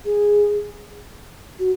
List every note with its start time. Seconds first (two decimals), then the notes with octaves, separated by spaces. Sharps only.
0.05 G#4
1.59 F#4